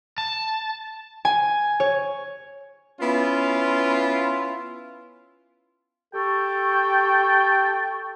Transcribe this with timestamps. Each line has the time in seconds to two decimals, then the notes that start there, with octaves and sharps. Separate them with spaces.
0.18 A5
1.25 G#5
1.80 C#5
3.01 B3 C#4 E4 F4
6.14 G4 A4 G5 A5 C#6